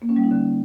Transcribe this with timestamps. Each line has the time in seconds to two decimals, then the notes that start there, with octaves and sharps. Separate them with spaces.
0.02 A#3
0.09 C#4
0.16 G3
0.24 D#4
0.31 D3